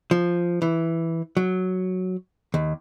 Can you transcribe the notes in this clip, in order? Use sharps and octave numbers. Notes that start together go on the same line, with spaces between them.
F3
E3
F#3
D#2